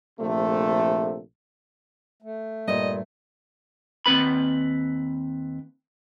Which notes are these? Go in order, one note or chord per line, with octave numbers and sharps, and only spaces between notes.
A#1 C3 A3
A3
G2 A#2 G3 D#5
D#2 C4 B4 B5